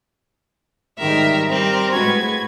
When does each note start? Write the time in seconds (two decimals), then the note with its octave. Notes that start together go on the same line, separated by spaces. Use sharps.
0.98 G#2 D#3 G3 A#4 E5
1.50 G3 C4 A#4
1.94 A2 G#3 F#4 B4 G#6